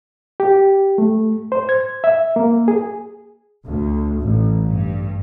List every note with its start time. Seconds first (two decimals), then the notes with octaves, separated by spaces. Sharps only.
0.40 G4
0.98 A3
1.52 C5
1.69 G#6
2.04 E5
2.36 A#3
2.68 G#4
3.67 D2
4.21 A1
4.68 G2